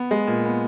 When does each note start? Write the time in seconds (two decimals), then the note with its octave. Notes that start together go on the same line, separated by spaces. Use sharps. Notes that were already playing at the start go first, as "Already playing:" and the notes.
Already playing: B3
0.11 G#3
0.27 A#2
0.45 B3